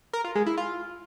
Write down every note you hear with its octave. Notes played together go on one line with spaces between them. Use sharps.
A#4
F4
G#3
E4
F4